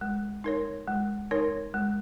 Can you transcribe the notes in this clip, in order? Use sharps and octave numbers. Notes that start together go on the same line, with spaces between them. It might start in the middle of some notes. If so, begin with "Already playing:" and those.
G#3
D#4 A#4 C#5
G#3
D#4 A#4 C#5
G#3